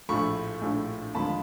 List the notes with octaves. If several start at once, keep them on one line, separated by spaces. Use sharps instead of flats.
A#1 A2 F3 A3 B5 C#6
A#1 A2 F3 A3
D#2 D3 F3 G#3 A5 B5